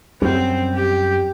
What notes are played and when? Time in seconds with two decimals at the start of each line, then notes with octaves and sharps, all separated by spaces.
0.22 F#2 G3 C4
0.74 G4